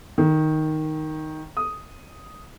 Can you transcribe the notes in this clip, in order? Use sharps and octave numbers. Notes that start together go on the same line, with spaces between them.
D#3
D#6